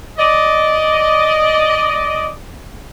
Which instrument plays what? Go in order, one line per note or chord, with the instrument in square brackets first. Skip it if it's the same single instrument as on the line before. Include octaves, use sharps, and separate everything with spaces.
[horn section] D5 D#5